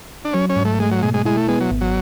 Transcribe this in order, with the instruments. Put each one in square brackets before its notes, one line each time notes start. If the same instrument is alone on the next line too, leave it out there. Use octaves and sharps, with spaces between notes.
[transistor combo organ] D4
[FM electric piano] F#3 [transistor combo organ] C#4
[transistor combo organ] C#4
[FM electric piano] G#2
[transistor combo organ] A3
[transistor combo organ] G#3 [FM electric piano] A3
[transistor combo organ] F#3
[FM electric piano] B2 [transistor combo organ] G#3
[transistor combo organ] G#3
[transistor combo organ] G#3 [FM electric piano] E4
[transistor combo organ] A3
[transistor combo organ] G#3 [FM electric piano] B3
[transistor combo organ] F#3
[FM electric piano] G#1
[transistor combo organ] F#3